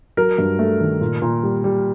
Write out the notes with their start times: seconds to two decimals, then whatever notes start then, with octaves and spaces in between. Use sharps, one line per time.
0.17 F#3 A#4
0.38 G2
0.59 A3
0.81 D#3
1.01 A#2
1.22 A#2
1.43 G3
1.64 G3